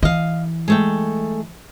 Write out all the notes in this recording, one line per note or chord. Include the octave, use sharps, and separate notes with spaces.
E3 D#5 F5
G#3 A3 G5